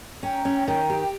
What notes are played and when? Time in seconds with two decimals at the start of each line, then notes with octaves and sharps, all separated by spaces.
0.23 C#4 G5 A#5
0.45 C#4
0.67 D#3 G5 A#5
0.89 G4